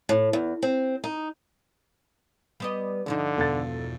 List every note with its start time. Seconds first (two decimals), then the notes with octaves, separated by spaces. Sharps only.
0.09 A2
0.33 E2
0.63 C4
1.04 D#4
2.60 G3 B3 D#5
3.06 G2 D3 F3 D#4
3.38 E2 B2 B3 A4 A6